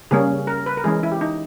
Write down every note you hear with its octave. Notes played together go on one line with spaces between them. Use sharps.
C#3 G3 A#3 C#4 G#4
A#4
B4
A#4
E3 G#3 C#4 G#4
E4
G4
D#4